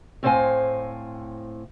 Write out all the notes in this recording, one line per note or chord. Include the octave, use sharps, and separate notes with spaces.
A2 C4 C5 D5 F5 G#5